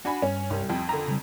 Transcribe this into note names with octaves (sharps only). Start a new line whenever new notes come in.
D4 F#4 G#5 B5
G2 C#4
C2
F2 G5
D3 A#5
C#3 G3